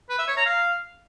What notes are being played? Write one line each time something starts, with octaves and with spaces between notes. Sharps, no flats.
B4
E5
C#5
A#5
F5